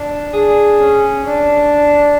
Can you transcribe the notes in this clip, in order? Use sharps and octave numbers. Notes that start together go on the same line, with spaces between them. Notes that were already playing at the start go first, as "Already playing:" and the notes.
Already playing: D4
D4 G#4
C#4
D4